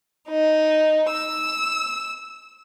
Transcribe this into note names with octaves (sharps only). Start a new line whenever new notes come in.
D#4
E6